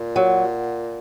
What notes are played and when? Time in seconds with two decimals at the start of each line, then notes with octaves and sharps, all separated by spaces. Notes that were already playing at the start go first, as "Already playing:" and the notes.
Already playing: A#2
0.16 F#3